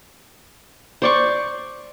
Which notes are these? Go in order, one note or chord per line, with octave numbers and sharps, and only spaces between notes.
C5 D5 C#6